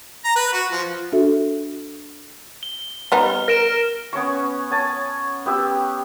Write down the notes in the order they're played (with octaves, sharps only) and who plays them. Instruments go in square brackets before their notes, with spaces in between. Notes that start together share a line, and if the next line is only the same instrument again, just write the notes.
[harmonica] A#5
B4
F#4
F3
[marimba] D4 F#4 A4 E5
[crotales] G7
[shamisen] G3 B3 D#4 [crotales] F6
[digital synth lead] A#4 [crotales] A#6 D7 E7
[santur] B3 C#4 C#5 C#6
C#5 G#5 A5
B3 G4 E6